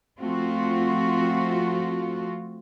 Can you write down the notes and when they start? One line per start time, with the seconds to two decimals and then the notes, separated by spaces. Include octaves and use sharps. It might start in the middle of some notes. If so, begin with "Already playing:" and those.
0.21 F3 A3 C4 F4 F#4